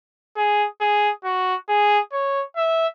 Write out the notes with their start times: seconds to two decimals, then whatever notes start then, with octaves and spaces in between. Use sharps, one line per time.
0.37 G#4
0.80 G#4
1.24 F#4
1.69 G#4
2.13 C#5
2.56 E5